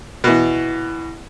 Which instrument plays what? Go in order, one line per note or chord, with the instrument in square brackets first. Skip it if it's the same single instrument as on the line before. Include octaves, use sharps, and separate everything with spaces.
[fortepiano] B2 E3